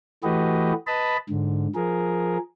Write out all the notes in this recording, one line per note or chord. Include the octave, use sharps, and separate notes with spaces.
E3 A3 F#4 G4 B4 D#5
B4 D#5 A5 B5
G#2 D3
F3 G#4 A#4